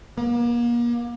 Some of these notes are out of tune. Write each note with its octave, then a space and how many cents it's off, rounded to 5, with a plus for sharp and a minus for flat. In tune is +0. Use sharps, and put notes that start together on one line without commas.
A#3 +35